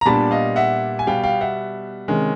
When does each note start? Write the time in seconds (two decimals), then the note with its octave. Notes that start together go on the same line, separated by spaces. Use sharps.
0.01 A#5
0.05 A#2 G3 B3 D4 A5 B5
0.31 D#5 F5
0.56 E5 F#5
0.99 G#5
1.07 B2 G3 B3 F5 G5
1.24 F5 G5
1.41 E5 F#5
2.08 C3 D#3 G#3 C#4